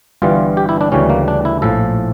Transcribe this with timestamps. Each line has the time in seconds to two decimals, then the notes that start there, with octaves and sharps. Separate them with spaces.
0.22 G1 G2 E3 G3 F4
0.57 G4
0.69 E4
0.81 D4
0.92 D2 C#3 E3 G3 C#4
1.10 A#3
1.28 D4
1.45 E4
1.62 A#1 A2 F3 A4